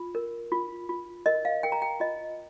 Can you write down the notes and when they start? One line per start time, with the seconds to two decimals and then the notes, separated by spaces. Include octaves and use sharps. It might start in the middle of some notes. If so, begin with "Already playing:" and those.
Already playing: F4
0.15 A#4
0.52 F4
0.89 F4
1.26 A#4 D#5
1.45 F5
1.63 A#4 G5
1.72 A#5
1.82 G5
2.00 F4 D#5